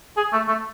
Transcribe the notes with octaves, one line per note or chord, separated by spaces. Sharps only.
G#4
A3
A3